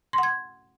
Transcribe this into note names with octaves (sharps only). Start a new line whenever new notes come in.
F#5 C6 G#6